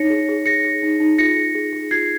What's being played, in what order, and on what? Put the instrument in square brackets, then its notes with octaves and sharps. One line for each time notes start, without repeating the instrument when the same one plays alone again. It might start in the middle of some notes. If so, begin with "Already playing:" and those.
Already playing: [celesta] D#4 C#5 A#6 C#7
G#4
G#4
G#4 A#6 C#7
G#4
D#4
D#4
F4 A#6 C#7
G#4
G#4
G#4
F4 G#6 C7